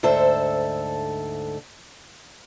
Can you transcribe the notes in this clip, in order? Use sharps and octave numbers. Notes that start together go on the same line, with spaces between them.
D2 G#2 A4 C5 E5